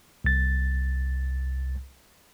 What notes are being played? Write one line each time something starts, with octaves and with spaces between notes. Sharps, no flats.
C2 A6